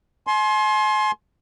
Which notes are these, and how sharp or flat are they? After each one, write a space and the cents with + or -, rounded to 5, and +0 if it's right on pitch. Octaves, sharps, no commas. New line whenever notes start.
G#5 +40 C6 +20